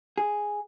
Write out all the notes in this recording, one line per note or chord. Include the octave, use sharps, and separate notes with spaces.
G#4